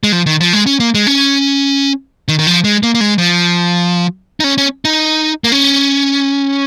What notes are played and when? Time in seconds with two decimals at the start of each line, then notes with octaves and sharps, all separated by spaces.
0.03 G#3
0.12 F3
0.26 D#3
0.40 F3
0.53 G#3
0.66 C#4
0.80 A#3
0.94 G#3
1.07 C#4
2.28 D#3
2.39 D#3
2.47 F3
2.64 G#3
2.83 A#3
2.95 A#3
3.01 G#3
3.18 F3
4.40 D#4
4.44 C#4
4.58 C#4
4.85 D#4
5.44 A#3
5.52 C#4